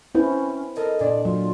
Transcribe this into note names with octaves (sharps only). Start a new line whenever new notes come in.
C4 C#4 E4 B4 G6
A4 A#4 D#5
A#2 D4 D5
F#3 F4